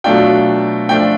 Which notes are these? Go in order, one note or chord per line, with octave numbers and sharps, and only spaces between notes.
B2 F#3 A3 D4 F4 G5
F3 A3 D4 F4 G5